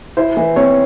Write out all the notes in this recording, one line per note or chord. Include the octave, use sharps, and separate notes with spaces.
E4 C5
E3
C4 C#5